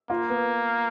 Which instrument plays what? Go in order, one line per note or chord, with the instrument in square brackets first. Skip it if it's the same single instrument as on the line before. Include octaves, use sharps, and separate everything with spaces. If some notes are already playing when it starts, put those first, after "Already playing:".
[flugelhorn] A#3 [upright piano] F4
[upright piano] B3